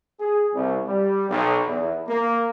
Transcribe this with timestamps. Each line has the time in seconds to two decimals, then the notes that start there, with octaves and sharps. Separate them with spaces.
0.20 G#4
0.53 C2
0.86 G3
1.29 B1
1.67 E2
2.08 A#3